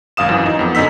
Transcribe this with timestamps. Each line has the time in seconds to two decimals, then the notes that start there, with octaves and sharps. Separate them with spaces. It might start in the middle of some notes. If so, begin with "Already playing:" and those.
0.17 G#1 F#2 F5 D#6 E7
0.29 F#2 E3
0.46 D#4
0.59 F2 B3
0.75 F#2 D3 D#4 E6 B6